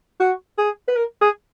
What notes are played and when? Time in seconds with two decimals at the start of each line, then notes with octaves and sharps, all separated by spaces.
0.20 F#4
0.58 G#4
0.88 B4
0.96 A#4
1.21 G#4